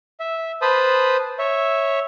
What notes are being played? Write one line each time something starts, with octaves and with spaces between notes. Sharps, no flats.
E5
B4 C5 A5 B5 D#6
C#5 E5